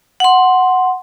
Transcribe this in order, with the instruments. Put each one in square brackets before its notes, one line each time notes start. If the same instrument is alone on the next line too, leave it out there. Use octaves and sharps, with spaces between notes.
[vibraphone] F#5 C6